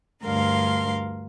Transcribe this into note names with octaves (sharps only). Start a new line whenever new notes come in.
D2 G2 A#4 F5 C6